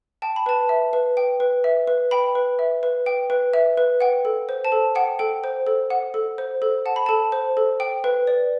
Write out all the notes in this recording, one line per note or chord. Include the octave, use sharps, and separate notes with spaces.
G5 A5
B5
B4 A5
E5
B4
G5
B4
E5
B4
G5 B5
B4
E5
B4
G5
B4
E5
B4
F#5 G5
A4
C5
A5
A4
F#5 G5
A4 G5
C5
A4
F#5
A4
C5
A4
F#5 A5
B5
A4 A5
C5
A4
G5
B4
D5